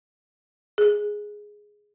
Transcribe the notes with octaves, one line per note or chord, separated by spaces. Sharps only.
G#4